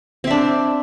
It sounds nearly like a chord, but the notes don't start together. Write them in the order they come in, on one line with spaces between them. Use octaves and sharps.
C4 E5 D4